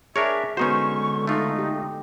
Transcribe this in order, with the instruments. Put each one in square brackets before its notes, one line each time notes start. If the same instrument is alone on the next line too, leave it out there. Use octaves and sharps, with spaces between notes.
[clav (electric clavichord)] D4 A#4 C#5 [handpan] G#4 [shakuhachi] E5
[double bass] D3 G#3 [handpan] B3 F#4 [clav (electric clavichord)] C#4 D#4 C5 [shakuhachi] C#6
[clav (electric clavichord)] A3 F4 [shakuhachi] D#4
[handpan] G4